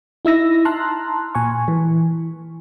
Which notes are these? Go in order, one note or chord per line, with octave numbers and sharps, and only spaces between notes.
D#4 E4 E6 A#6
A5 A#5 C6 F6 F#6
A#2 G#5 C#6
E3